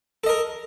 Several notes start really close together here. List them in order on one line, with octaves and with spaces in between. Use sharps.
A4 D#5 A#4